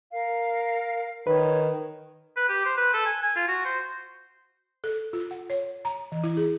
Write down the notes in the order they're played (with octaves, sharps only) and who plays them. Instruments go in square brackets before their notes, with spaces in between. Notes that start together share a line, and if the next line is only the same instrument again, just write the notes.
[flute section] A#4 F5
[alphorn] D#3 [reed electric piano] B4 [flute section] C#5
[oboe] B4
G4
C5
B4
A4
G#5
G#5
F4
F#4
C5
[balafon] A4
F4
F#5
C#5
A#5
E3
E4
G#4